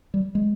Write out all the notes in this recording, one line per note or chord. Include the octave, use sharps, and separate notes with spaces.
G3
G#3